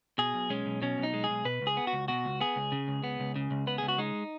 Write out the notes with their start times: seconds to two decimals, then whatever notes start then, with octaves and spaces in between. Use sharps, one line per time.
0.18 B2 G#4
0.34 B1
0.50 G#3 C#4
0.66 B1
0.82 B2 C#4
0.98 B1
1.03 D#4
1.14 G#3
1.24 G#4
1.30 B1
1.45 B2 B4
1.61 C#2
1.67 G#4
1.77 B3
1.87 F#4
1.93 C#2
2.08 B2 F#4
2.25 C#2
2.41 B3 G#4
2.56 C#2
2.72 C#3
2.88 C#2
3.04 B3
3.20 C#2
3.36 C#3
3.51 C#2
3.67 B3 B4
3.78 C#2 G#4
3.88 F#4
3.98 G#3 D#4